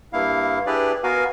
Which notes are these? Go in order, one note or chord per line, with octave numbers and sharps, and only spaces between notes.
G2 A#3 E4 F5
D4 E4 G4 G#4 B4 D5
B3 F#4 A#4 F5 G#5